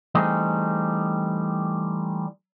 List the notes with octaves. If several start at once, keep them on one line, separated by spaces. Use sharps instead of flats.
E3 G3 A3 C4 D#4 G#4